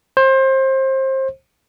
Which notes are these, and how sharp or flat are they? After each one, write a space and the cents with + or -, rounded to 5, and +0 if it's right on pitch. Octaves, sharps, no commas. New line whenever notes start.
C5 +25